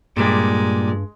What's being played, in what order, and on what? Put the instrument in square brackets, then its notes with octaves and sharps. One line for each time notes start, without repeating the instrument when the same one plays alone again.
[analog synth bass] G2 [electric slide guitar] A#2 G3 [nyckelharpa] G#3